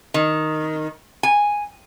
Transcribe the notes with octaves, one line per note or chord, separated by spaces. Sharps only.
D#3
G#5